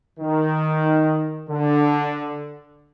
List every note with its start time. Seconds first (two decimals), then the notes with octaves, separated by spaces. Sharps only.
0.20 D#3
1.49 D3